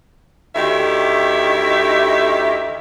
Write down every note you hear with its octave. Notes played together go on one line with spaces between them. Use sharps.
D2 D#3 E4 G4 E5